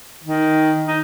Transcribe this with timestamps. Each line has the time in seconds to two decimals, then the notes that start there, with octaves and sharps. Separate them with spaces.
0.24 D#3
0.86 D#4